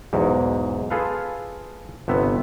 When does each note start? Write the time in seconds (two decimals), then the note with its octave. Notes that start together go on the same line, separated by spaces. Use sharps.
0.13 B1 E2 G#2
0.90 F4 G#4 A4 B4 F5
2.08 G1 C3 B3 E5